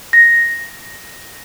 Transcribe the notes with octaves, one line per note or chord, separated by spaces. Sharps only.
A#6